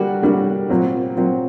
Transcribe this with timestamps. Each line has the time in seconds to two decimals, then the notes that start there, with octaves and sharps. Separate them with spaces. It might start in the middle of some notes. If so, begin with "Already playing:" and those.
Already playing: D3 G3 A#3 D4 F#4
0.22 D3 G3 A#3 D4 F#4
0.69 A#2 F#3 C4
1.17 A#2 F#3 C4